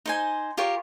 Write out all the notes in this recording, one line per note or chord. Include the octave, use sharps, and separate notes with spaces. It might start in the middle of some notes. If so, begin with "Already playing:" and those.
D#4 C5 G#5
F4 G4 A#4 C#5